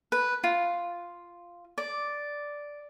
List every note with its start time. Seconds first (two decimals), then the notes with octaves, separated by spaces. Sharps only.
0.12 B4
0.44 F4
1.78 D5